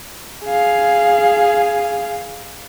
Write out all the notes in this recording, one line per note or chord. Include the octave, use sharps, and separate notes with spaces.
G#4 F5